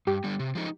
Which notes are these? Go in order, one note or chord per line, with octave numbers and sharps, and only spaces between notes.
G2 G4
D3 G3
C3
F3 G#3 D#4